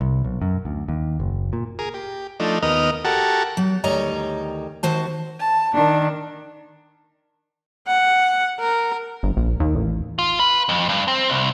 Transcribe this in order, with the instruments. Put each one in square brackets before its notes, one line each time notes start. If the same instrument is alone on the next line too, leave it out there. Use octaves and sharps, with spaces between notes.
[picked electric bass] C2
B1
F#2
D2
D#2
F#1
A#2
[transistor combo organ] G#4 A#4
G4
F3 A3 D4 D#4
D#2 B3 D#4 A#4 D#5 F6
F#4 G4 A4 A#4 F#5 A5
[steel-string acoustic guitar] F#3
D2 D#3 G3 C#5 D#5 A#5
D#3 F#4 C5 A5
[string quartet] A5
D#3 D4
[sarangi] F#5
A#4
[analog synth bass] G1
A#1
D#2
A1
[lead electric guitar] F4
B4
F2
G2
C4
C2